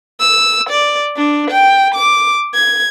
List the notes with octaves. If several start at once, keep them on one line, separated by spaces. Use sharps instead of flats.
E6
D5
D4
G5
D6
G#6